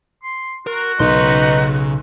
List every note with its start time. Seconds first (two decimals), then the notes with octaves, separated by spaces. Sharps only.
0.23 C6
0.67 F#4 A#4
0.99 B1 C#3 D#4 B4 C6